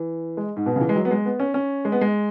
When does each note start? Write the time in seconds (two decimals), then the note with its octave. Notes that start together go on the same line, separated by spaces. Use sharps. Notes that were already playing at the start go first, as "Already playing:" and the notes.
Already playing: E3
0.37 G#3
0.56 G#2
0.66 B2
0.76 C#3
0.81 E3
0.89 G#3
0.96 F#3
1.05 B3
1.11 G#3
1.25 B3
1.40 C#4
1.54 C#4
1.85 G#3
1.92 B3
2.01 G#3